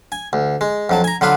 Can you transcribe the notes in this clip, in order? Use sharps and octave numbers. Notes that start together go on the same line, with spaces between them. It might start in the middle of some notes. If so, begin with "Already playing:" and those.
G#5
D2
G#3
F2 F#3 A5
G#5 A#5
D3 F#3 F4 B4